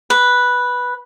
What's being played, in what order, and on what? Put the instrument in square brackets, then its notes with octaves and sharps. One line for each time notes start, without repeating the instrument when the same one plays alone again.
[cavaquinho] B4